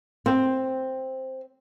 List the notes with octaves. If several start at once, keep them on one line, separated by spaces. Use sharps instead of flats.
C4